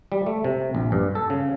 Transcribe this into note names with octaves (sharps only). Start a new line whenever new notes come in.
G3
A3
C3
A#1
G2
A4
C#3